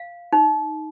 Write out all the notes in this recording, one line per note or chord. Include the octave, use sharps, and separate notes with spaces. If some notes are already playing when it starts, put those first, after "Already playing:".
Already playing: F5
D#4